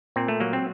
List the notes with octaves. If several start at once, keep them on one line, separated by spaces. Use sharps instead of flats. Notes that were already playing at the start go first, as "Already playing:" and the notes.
A#2 C4
A3
F#3 A#3
C4